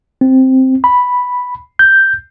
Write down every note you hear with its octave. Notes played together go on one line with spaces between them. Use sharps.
C4
B5
G6